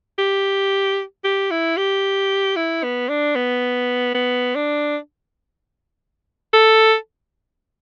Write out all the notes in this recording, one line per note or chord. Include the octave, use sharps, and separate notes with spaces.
G4
G4
E4
G4
E4
B3
D4
B3
B3
D4
A4